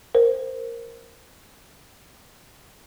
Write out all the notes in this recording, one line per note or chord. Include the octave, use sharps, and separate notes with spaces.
A#4 C5